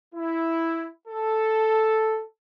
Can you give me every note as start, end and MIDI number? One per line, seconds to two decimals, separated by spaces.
0.15 0.88 64
1.08 2.23 69